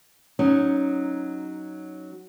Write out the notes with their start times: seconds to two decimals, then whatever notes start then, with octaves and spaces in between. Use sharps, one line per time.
0.39 F#3 C#4 D#4